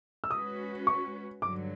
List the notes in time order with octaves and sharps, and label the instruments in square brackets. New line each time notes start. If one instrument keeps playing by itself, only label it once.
[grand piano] E6
[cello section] G#3 C#4 F#4 B4 [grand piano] D#6
[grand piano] C#6
[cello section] G2 D3 F#3 [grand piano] D6